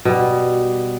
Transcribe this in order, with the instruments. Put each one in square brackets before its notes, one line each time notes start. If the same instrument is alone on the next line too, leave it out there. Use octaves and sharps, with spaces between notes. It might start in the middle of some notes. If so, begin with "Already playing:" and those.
[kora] B2 G3